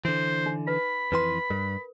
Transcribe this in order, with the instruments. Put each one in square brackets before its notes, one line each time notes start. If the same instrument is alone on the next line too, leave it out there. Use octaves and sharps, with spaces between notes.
[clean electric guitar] D3 E3 [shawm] C5
[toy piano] D#4
[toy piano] B4 [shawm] B5
[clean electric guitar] F2 E3 C6 [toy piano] B4
[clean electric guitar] G2 [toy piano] A#4